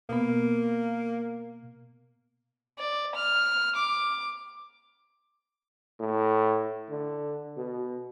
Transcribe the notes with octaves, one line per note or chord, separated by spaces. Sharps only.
B2 A#3 B3
D5
F6
D6
A2
D3
B2